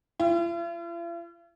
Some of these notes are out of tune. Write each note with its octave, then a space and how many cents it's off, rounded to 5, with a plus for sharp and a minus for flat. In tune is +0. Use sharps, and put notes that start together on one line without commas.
F4 -45